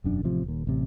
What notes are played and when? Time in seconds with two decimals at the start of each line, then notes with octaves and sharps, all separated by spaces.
0.04 E1 F#2 D4
0.24 A1 C3 F3
0.44 D#1 D#2
0.67 A1 C3